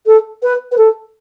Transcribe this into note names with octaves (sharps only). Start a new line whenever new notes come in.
A4
B4
B4
A4